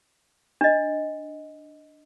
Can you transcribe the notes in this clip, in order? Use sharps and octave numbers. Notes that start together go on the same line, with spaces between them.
D4 D#5